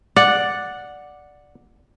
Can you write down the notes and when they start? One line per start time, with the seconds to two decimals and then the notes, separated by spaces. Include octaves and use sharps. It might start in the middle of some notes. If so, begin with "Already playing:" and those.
0.16 D5 F#5